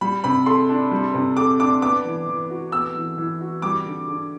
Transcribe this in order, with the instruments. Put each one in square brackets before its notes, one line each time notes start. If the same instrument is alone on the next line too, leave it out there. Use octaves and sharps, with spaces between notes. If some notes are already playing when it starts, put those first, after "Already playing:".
[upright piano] G3 [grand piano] B5
[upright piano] C3 [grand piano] B5
[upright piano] A4 [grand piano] C6
[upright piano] D4
G3
C3
[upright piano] A4 [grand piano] D6
[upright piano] D4 [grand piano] D6
[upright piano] B3 [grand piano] D6
[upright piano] E3
E3
F#4
[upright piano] B3 [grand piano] E6
[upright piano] E3
E3
F#4
[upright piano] G3 [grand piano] D6
[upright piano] D3
D3